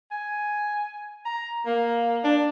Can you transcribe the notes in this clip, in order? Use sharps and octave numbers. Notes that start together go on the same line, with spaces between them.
G#5
A#5
A#3
D4